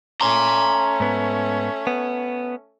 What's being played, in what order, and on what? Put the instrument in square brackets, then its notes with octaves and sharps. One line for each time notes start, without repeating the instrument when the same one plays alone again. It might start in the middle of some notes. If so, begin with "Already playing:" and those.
[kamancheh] A3 C#4 [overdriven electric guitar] A#5 C6
[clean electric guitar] G#2 B3
B3